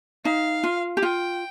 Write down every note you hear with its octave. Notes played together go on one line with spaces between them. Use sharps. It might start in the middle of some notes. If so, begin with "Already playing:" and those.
D#4 F5
F4
G4
F4 G5